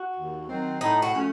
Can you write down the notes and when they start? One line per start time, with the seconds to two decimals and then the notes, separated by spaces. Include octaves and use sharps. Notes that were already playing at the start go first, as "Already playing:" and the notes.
Already playing: F#4
0.16 D#2
0.48 D#3 F#3 C4
0.81 A2 D#4
1.02 F#4
1.13 F3 A3 C#4